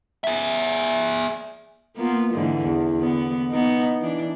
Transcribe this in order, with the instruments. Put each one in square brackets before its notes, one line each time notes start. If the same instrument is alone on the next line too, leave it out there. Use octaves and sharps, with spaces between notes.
[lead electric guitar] G#4 E5
[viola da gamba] A#3 B3 F4
G#2 D3 E3
E2
D3 B3
B3 D#4
E3 D4